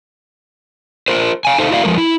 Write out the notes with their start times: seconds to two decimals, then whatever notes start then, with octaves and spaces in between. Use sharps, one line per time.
1.08 F4 A#4 C5
1.45 F5 G#5
1.58 D#4 A4 C5 F5
1.71 E4 F#4 D5 F5
1.83 F3 G#3 A#4
1.98 E4